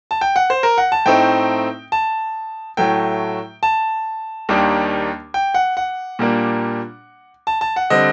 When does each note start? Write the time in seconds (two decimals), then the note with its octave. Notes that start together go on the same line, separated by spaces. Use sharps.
0.11 A5
0.21 G5
0.36 F#5
0.50 C5
0.63 A#4
0.78 F#5
0.92 A5
1.06 A2 A3 C4 D#4 G5
1.92 A5
2.77 A2 F#3 A3 G5
3.63 A5
4.49 D#2 D#3 G3 A#3 D4
5.34 G5
5.54 F#5
5.77 F#5
6.19 A#2 G3 A#3 D4
7.47 A5
7.61 A5
7.76 F#5
7.90 D3 G3 C4 D#5